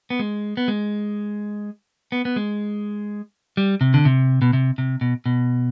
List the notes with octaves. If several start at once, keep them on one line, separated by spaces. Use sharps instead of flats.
B3
G#3
B3
G#3
B3
B3
G#3
G3
C3
D3
C3
B2
C3
C3
B2
B2